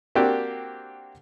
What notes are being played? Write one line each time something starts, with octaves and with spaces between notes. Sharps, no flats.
A#3 C4 D4 F#4 G4